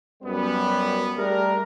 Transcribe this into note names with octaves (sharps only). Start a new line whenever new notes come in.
F#2 G3 B3
G3 A3 D4 G#4 A#4